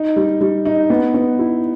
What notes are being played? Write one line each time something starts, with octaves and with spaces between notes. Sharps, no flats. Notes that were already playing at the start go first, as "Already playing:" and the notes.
Already playing: D#4
G3
G3
D#4
B3
B3
E4